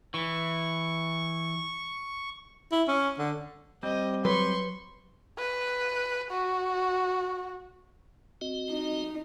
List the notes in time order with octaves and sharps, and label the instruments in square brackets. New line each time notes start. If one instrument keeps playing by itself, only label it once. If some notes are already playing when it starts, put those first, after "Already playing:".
[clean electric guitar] E3 [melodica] C#6
[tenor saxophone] E4
C#4
D3
[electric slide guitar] G3 C4 [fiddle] D#5
[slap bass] F#3 [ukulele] B4 [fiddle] C6 C#6
[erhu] B4
F#4
[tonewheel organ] C4 F#4 D#5
[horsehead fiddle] D#4